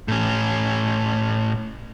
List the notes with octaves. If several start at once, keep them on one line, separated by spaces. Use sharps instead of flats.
A2 C#4